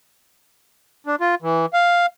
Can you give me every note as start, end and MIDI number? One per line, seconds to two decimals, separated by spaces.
1.06 1.15 62
1.21 1.35 65
1.42 1.66 52
1.73 2.06 77